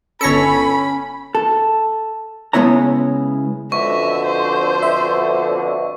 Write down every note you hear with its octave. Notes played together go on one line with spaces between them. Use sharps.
G1 C#4 A4 C#5 B5 A#6 C#7
A4
C#3 G#3 B3 E4 C#5 A#5
F2 B2 D3 E5 C#6
C5
E5